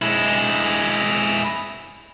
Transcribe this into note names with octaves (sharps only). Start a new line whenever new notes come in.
G#3 E4